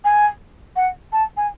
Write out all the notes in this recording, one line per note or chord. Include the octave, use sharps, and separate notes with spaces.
G#5
F#5
A5
G#5